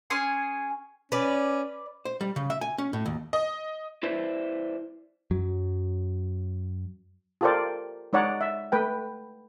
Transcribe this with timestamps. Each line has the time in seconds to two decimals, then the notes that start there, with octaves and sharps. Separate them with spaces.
0.10 C#4 G#4 G#5 C6
1.12 C#4 B4 D5
2.05 C5
2.21 G3
2.36 C#3
2.50 E5
2.61 G#5
2.78 C#4
2.93 A2
3.06 D#2
3.33 D#5
4.03 E4 B4 C5 D5 E5
5.31 F#2 F#3
7.41 F4 G4 A4 A#4 C5 D5
8.13 G#3 D#4 C#5 D5 F#5
8.41 E5
8.72 A3 B4 G5